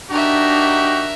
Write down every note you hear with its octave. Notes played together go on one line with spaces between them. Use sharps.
D4 D#4 F#4 G4 A#4 E5